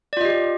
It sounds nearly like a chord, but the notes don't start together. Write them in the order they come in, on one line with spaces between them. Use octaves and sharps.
D5 F4 D#5 G4